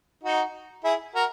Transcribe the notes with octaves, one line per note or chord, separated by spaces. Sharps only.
D#4 F#4
E4 G#4
F#4 A#4